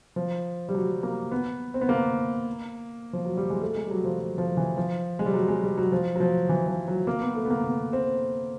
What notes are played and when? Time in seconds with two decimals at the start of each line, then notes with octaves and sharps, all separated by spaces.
0.16 F3
0.69 G3
0.75 F#3
1.03 A#3
1.31 B3
1.74 C4
1.81 B3
1.89 A#3
3.13 F3
3.25 F#3
3.37 G3
3.50 G#3
3.61 A3
3.76 G#3
3.87 G3
3.91 F#3
4.04 F3
4.19 F3
4.38 F3
4.57 E3
4.77 F3
5.19 G#3
5.26 G3
5.34 F#3
5.48 G#3
5.64 G3
5.78 F#3
5.92 F3
6.16 F#3
6.20 F3
6.49 E3
6.68 F3
6.88 F#3
7.07 A#3
7.21 B3
7.35 A3
7.45 B3
7.50 A#3
7.64 B3
7.93 C4